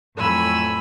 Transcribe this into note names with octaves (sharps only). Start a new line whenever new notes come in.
F2 A2 F#3 G#5 B5 E6